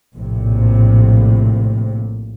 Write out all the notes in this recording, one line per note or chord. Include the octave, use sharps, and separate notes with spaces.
A#1 A2 C3